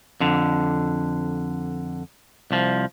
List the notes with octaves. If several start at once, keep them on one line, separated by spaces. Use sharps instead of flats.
F2 D3
C2 F3